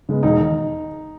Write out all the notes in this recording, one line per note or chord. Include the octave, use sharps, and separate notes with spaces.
C#3 G#3 B3
E1 D#4
D#2 D#3